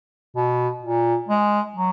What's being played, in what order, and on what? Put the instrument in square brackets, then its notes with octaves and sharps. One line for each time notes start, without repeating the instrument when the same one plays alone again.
[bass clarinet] B2
A#2
G#3
F#3